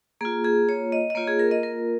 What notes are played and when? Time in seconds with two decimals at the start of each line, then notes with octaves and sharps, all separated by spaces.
0.21 A#3 F4 G#4
0.44 G#4
0.69 C#5
0.92 D#5
1.10 D#5
1.15 A#3 F4 C#5
1.27 G#4
1.39 A#4
1.51 D#5
1.63 A#4